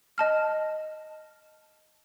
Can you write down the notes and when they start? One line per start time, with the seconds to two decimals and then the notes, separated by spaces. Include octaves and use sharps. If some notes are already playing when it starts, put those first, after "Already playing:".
0.18 D#5 A5 F6